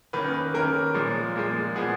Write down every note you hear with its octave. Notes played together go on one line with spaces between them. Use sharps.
D#3 A#3 C#4 B4
B4
D#3 A#3 C#4 A#4
A#2 F3 G#3
A#2 F3 G#3
A#2 F3 B3 G#4